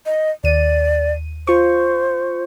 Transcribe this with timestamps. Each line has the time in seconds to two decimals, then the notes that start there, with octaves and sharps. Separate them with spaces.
0.06 D#5
0.44 D#2 D5 D#7
1.47 F4 C5 C#6